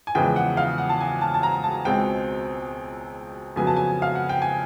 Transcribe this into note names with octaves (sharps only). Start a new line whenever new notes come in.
G#5
E2 C#3 F3 G#3 B3 G5
F#5
F5
F#5
A5
G#5
A5
A5
A#5
A5
C#2 B2 G#3 C4 G5
F2 C#3 F#3 B3 G#5
A5
G#5
F5
F#5
G5
G#5